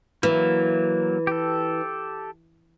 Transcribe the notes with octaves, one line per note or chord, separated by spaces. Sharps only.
E3 F#3 A#3
G4 A4